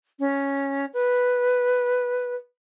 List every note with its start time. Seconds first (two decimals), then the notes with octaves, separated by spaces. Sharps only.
0.19 C#4
0.93 B4